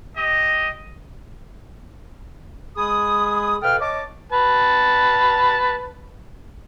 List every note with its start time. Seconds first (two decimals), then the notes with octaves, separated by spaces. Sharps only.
0.16 G4 D#5
2.76 G#3 G#4 G#5 B5 D#6
3.62 B2 A4 B4 F5 G5 F6
3.80 C#5 D#5 A5 D6
4.32 B4 A5